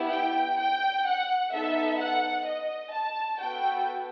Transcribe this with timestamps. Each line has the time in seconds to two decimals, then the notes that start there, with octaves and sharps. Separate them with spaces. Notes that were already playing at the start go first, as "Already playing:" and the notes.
Already playing: B3 E4 G4
0.12 G5
0.59 G5
1.06 F#5
1.53 B3 D#4 A4 E5
1.99 F#5
2.46 D#5
2.93 A5
3.39 B3 F#4 A4 G5